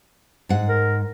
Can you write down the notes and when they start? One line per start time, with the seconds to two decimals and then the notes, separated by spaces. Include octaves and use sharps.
0.49 G#2 F#5
0.69 A#4